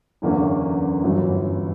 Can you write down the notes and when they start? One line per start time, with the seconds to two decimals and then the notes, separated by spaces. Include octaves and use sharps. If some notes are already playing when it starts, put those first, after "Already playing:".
0.22 F#1 E2 D3 A#3 C#4
1.03 G1 F#2 E3